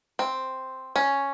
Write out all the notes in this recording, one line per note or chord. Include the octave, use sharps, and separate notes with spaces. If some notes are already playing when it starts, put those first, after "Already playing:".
C4
C#4